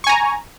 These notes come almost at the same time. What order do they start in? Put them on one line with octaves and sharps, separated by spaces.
C#6 G#5 A#5